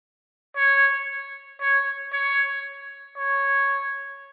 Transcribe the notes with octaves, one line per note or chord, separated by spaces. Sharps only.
C#5
C#5
C#5
C#5